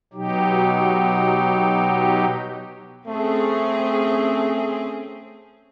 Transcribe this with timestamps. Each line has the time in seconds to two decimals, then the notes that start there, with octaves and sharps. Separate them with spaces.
0.13 B2 F#3 D#4 G4
3.07 A3 C4 C#4 G#4